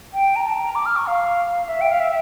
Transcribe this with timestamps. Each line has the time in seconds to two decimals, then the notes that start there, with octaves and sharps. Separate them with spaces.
0.14 G5
0.36 A#5
0.44 A5
0.55 A#5
0.66 A#5
0.75 D6
0.86 F6
0.96 C#6
1.07 F5
1.68 E5
1.81 G5
1.90 F5
2.00 E5